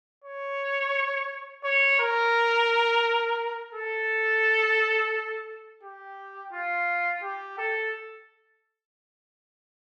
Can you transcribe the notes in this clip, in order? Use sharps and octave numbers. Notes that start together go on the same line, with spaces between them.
C#5
C#5
A#4
A4
G4
F4
G4
A4